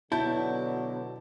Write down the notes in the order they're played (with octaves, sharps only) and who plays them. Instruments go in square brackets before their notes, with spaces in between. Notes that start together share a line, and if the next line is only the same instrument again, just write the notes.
[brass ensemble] B2 D3 [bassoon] F#3 [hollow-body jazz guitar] E4 [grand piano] A5 G6